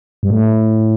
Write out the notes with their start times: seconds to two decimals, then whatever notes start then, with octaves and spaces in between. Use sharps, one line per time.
0.23 G2
0.30 A2